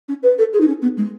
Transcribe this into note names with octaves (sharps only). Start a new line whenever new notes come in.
C#4
B4
A4
G#4
D#4
C#4
B3
G#3